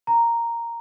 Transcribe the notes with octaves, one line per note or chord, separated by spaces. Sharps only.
A#5